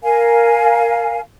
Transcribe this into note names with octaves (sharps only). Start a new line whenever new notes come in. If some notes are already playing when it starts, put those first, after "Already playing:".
A#4 F5 G#5